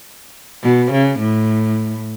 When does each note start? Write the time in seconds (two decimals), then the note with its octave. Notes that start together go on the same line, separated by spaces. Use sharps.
0.63 B2
0.92 C#3
1.19 A2